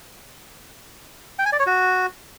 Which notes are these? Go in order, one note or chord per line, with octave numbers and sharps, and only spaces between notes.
G5
G#5
D5
C#5
F#4